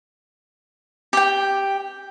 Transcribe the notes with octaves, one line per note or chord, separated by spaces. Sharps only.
G4 G5